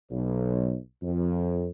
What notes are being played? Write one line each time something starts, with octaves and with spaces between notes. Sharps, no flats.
B1
F2